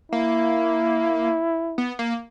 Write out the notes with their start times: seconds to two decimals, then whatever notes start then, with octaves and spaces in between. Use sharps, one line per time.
0.12 A#3 E4
1.78 B3
1.99 A#3